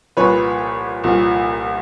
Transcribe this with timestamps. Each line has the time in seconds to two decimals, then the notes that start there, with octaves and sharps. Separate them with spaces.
0.17 C2 A#2 F3 B4 C#5
1.04 C2 A#2 F3